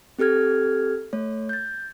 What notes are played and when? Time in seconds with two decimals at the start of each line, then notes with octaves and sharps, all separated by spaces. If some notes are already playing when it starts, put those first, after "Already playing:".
0.19 C4 G4 A4 F6 G#6
1.13 A3 C#5
1.49 G6 A6